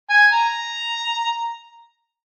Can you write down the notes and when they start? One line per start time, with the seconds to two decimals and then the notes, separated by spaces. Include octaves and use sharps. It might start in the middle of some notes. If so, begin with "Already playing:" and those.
0.10 G#5
0.31 A#5